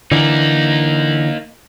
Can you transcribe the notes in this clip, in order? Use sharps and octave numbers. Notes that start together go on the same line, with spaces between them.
D3 E3 A#3 D#4